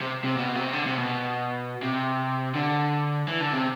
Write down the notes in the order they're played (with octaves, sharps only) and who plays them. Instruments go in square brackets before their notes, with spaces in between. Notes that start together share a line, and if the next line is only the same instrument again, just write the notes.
[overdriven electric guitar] C3
C3
B2
C3
D3
C3
B2
C3
D3
E3
D3
C3